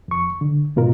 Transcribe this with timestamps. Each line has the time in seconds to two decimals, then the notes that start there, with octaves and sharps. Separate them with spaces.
0.08 F2 C#6
0.41 D3
0.76 G#2 B2 F4 A#4